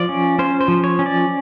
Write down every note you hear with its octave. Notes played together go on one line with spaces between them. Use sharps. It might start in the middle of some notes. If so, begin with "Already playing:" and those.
Already playing: F3 D5
C#4
C#4 C5
C5
F3
C#5
C#4
D5